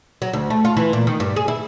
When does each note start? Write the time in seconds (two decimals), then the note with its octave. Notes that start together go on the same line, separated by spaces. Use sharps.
0.22 F#3
0.33 D2
0.50 A3
0.65 F4
0.77 E3
0.93 A#2
1.07 D#3
1.20 G2
1.36 G#4
1.48 E4